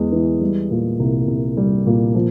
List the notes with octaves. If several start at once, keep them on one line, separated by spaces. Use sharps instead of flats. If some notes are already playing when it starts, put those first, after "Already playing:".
Already playing: E2 G#3
E3
G3
A#2
C2
C2
G3
A#2
F3